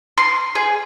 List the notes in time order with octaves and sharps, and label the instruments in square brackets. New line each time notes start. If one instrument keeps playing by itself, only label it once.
[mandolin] C6
G#4